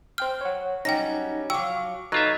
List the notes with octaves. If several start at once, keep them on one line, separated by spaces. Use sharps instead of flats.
C5 G5 F6 G6
C#5 F#5
F#3 G3 C#4 D#4 G5 A#6
F3 F#3 G5 C#6 D6 E6
F#3 D#4 F4 A4 B4 E5